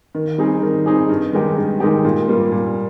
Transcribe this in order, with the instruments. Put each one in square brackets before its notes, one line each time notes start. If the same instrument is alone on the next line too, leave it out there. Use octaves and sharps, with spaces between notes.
[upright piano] D#3
G3 C4 D#4 G#4
D#3
G3 C4 D#4 G#4
G2
D#3 G#3 D#4 G4
G2
D#3 G#3 D#4 G4
A#2
G3 A#3 F4
A#2